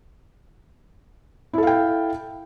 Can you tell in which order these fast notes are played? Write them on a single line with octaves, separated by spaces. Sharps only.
E4 A4 F5 G5